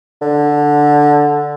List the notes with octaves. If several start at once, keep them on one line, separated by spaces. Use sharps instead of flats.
D3